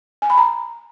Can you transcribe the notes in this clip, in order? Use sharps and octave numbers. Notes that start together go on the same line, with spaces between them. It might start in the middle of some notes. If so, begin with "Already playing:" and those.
G#5
B5
A#5